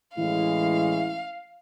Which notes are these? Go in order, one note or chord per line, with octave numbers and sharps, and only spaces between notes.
A2 E3 G#3 C#4 E4 F5